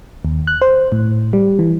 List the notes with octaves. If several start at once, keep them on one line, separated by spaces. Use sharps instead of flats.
D#2
F#6
C5
A2
G3
E3